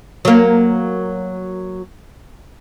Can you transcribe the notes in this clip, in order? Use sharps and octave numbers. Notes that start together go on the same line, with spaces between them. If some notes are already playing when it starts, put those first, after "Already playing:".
F#3 A#3